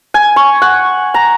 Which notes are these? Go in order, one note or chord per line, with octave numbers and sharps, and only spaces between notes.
G#5
C#6
F#5
A#5